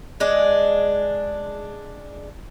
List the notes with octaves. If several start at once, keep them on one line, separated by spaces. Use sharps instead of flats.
G#3 D4